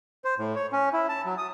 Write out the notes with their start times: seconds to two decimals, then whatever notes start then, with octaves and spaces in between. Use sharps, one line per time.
0.24 C5
0.38 A2
0.56 C#5
0.73 C#4
0.93 E4
1.09 A5
1.25 F#3
1.38 D#6